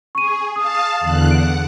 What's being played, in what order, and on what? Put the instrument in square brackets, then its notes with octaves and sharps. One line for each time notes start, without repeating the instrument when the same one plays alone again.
[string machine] G#4 [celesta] C#6 D#7
[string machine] F5 A5 [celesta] D#6
[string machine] E2 D3 F#6
[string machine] F#5 [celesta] D7